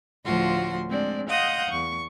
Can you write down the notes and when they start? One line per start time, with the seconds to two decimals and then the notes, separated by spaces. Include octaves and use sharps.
0.24 D2 A2 F3 F4 F#4 C6
0.89 G#3 C4 D4 D5
1.29 D#5 F5 F#5 C6 D#6 G6
1.69 E2 C#6